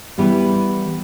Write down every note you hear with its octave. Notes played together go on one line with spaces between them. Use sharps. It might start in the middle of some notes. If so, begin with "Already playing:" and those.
E3 G3 B3 E4 G4